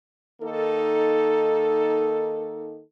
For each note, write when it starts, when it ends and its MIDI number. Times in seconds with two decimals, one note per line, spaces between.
0.42 2.82 51
0.42 2.82 58
0.42 2.82 63
0.42 2.82 69